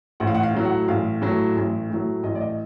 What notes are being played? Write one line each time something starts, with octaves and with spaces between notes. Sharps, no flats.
A1 F#5
F5
F#5
F5
A2 F#3
F#5
A1 F5
A2 F#3
A1
A2 F#3
A1 D#5
D5
D#5